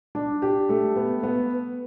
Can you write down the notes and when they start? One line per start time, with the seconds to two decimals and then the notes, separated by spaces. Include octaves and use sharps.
0.15 D4
0.42 G4
0.69 A3
0.96 B3
1.23 B3